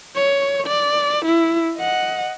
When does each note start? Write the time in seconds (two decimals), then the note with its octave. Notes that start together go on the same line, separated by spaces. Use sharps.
0.15 C#5
0.67 D5
1.25 E4
1.77 D#5 F#5